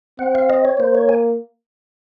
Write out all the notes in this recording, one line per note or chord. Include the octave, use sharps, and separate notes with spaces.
C4 F#5
F5
D#5
C#5
A#3 C5
C#5
G#5